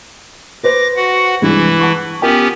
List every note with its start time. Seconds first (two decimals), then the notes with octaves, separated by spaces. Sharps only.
0.63 B4 C5 D6 A#6
0.96 F#4 F#5
1.42 C2 G2 E3 G#3 E4
1.80 F#5 A5 C#6
2.22 B3 C#4 F4 G4 A#4 G5